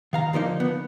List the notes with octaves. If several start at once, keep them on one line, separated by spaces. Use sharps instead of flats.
D#3 F5 A#5
D3 F3 A#3 D#4
B3